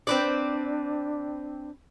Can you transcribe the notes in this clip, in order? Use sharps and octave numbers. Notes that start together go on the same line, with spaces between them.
C4 D4 B4 D5